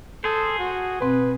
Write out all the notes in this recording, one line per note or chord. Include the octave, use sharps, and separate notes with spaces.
G#4 A4 C5
F#4
B2 C4 B4